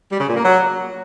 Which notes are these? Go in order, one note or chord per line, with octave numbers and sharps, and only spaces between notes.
G3
C#3
A#2
A#3
F#3